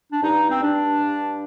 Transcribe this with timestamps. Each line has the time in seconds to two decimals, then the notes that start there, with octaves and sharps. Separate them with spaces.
0.11 D4
0.23 G2 D#4
0.50 C4
0.62 G2 D4
1.00 G2